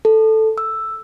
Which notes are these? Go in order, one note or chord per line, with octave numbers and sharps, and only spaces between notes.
A4
E6